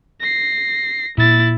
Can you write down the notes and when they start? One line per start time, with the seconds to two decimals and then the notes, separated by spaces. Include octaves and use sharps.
0.21 A#6 C7
1.18 A#2 E4 A6